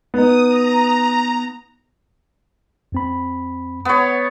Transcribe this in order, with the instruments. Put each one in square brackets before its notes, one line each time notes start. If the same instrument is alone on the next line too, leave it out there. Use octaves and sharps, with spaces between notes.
[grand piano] B3 D#4 [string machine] D#6
[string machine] A#5
[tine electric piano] F2 C4 B5
[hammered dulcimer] B3 C#5